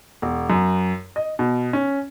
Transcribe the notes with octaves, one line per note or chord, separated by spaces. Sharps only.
E1
F#2
D#5
B2
C#4